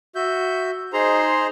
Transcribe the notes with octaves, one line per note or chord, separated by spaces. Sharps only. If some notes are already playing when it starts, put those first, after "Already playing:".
F#4 E5 G6
D#4 G#4 C5 A#5 C6